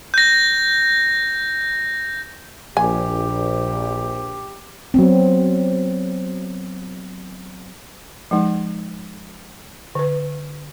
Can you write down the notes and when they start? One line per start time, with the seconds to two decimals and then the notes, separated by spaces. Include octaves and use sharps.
0.14 G6 A#6
2.77 A#1 G4 G#5
4.94 F#3 B3 C4
8.31 F3 G#3 D#4
9.95 D3 B4